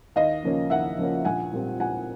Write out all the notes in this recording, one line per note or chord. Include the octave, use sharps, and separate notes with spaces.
D#2 D#5 F5
C#3 F3 A#3 C#4
D#2 E5 F#5
C#3 F3 A#3 C#4
A#1 F#5 G#5
A#2 G3 C4
A#1 F#5 G#5